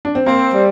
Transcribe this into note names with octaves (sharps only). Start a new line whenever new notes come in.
D4
C4
A#3 C4
G3